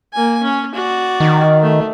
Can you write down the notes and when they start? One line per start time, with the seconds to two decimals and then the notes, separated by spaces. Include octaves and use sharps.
0.13 A#3 G#5
0.43 C#4
0.75 F#4 D5
1.20 D#3
1.63 A3